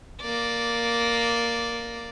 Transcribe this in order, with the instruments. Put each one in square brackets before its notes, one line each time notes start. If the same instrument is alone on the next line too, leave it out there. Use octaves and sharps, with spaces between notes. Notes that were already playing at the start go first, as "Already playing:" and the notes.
[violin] A#3 D5